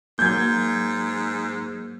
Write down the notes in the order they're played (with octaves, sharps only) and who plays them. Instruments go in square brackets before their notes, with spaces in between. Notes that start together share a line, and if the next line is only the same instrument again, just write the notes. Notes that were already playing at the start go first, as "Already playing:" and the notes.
[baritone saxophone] G#2 [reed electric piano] F#3 A#3 [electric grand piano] G6 G#6